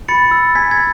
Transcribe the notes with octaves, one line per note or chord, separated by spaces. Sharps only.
B5 A6 C#7
E6
G#5 G#6 B6
G#6